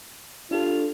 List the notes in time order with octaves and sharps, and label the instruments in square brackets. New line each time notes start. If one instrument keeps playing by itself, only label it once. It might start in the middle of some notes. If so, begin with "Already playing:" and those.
[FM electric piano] D4 G4 A4 [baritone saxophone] F4